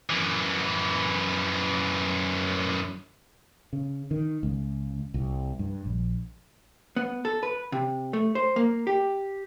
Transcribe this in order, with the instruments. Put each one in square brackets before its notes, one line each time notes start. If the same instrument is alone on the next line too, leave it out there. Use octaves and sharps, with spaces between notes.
[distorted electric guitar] F#2 E3
[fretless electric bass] C#3
D#3
C#2
C2
G2
A#1
[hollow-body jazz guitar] B3
A4
B4
C3
A3
C5
A#3
G4